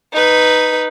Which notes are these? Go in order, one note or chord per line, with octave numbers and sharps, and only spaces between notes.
D#4 B4